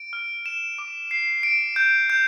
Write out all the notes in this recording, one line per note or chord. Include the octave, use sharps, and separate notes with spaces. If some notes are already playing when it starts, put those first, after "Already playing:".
Already playing: D7
F6
E7
D6
C7
D7
G6
G6